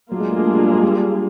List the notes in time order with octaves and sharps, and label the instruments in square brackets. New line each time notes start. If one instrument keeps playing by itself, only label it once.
[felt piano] F#3 [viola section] A#3 D4 F4 G#4
[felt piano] G#3
A3
G#3
G3
F#3
G3
G#3
G3